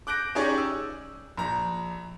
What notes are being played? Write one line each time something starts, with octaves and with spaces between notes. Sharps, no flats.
D6 F#6 G6 A#6 D7
C#4 D#4 G4 G#4 C#5 D5
E6
A#1 A#5